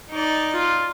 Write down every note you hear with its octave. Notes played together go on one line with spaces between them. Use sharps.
D#4 D5
F4